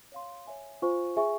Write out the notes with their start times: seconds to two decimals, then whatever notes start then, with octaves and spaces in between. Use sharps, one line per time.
0.12 C#5 F5 C6
0.47 C#5 E5 G#5
0.82 F4 C5 F5 G#5 C#6
1.17 G#4 E5 G#5 C#6